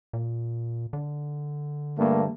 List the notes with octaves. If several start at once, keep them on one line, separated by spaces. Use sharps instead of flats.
A#2
D3
G2 A3 A#3